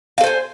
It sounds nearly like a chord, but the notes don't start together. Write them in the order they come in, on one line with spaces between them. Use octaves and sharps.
F5 A4 C5 G#5